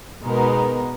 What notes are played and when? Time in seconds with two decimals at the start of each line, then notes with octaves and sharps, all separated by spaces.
0.24 B2 G#3 B3 D#4 A#4